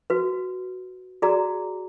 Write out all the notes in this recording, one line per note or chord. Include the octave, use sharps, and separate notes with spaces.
F#4 B4
F#4 G#4 D5 A#5